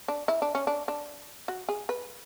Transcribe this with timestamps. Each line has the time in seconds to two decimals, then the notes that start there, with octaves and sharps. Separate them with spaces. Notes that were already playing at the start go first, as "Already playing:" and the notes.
0.08 D4
0.28 E4
0.42 D4
0.55 C#4
0.67 D4
0.88 D4
1.48 F#4
1.69 G#4
1.89 B4